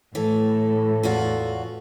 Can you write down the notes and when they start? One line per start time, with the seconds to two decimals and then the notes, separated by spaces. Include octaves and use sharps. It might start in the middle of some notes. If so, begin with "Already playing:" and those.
0.15 A2 E3 A4
1.03 E2 F4 F#4